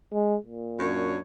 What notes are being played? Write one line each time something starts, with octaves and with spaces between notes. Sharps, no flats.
G#3
A#2
F#2 D4 C#5